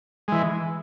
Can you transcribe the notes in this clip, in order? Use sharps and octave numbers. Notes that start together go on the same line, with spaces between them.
E3 G#3